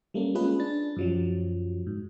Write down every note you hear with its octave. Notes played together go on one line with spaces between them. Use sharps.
G3 A3 A#3 C#4
G#3 C#4 F4 G#4 B4
D4 A6
F#2 F3 F#3
G#2